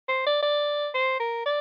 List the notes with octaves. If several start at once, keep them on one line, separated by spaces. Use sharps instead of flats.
C5
D5
D5
C5
A#4
D5